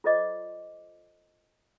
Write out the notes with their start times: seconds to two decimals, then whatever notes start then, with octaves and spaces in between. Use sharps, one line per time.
0.04 F4 A4 C5 D5 D#5 D6